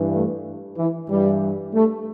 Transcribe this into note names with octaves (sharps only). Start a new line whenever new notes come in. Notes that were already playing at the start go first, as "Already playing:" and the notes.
Already playing: G2 E3
A3
E3
G2 E3 G3
A3